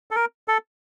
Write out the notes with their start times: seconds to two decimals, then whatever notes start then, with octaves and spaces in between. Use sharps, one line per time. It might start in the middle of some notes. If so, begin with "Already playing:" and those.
0.11 A4
0.16 A#4
0.48 A4